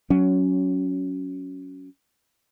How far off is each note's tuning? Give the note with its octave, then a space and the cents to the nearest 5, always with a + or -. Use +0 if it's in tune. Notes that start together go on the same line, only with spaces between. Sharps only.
F#3 +0 C#4 +10